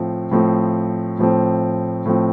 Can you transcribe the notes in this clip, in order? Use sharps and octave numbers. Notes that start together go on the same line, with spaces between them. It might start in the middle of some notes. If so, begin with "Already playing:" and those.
Already playing: A2 F3 C4
A2 F3 C4
A2 F3 C4
A2 F3 C4